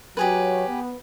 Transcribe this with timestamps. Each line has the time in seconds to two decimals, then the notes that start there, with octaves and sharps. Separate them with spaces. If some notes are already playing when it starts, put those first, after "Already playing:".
0.17 F#3 G4 G#4 B4
0.67 B3